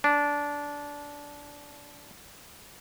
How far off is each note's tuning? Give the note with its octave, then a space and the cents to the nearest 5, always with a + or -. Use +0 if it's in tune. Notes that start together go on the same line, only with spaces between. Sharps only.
D4 -15